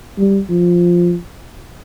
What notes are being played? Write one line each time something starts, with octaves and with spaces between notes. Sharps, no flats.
G3
F3